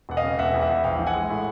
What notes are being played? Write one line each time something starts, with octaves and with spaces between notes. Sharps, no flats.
E1 F#5
D#5 F5
C#3
E1 E5 F#5
E2
E5 F#5
E2
A#1 F5 G5
E3
F#5 G#5
G#3
A2